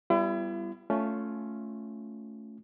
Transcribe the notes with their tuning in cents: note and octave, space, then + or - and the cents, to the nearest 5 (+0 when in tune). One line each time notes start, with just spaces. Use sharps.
G3 +0 B3 +10 E4 +40
A3 +0 C#4 +10 F4 +0